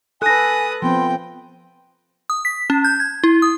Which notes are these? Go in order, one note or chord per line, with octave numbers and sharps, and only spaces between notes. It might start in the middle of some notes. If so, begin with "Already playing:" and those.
A4 B4 G#5 D#6 F#6 A#6
F3 B3 C4 G5 B5 C6
D#6
B6
C#4
G6
G#6
E4
D#6